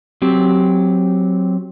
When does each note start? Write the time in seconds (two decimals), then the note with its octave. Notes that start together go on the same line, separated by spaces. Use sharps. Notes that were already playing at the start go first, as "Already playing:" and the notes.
0.22 F#3 C4 G4